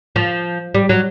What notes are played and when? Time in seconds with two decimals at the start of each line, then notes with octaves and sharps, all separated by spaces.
0.16 F3
0.74 G3
0.89 F#3